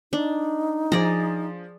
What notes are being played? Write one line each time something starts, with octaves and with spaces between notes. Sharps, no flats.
D4 D#4
F3 G#4 D5 A#5